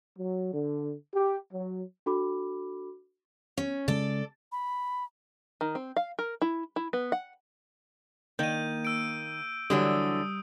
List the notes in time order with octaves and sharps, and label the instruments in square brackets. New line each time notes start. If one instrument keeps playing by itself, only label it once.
[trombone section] F#3
D3
G4
F#3
[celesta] D4 F#4 A4 B5 D6
[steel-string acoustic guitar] C#4
[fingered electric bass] C#3 G#3 C#4 [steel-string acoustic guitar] A4 D5
[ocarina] B5
[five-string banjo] D#3
C4
F5
A#4
E4
E4
B3
F#5
[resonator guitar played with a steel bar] D#3 [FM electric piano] A#3 [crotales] G6 D#7
[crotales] E6 D7
[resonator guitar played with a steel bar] D3 E3 F#3 [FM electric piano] G3 [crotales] D#6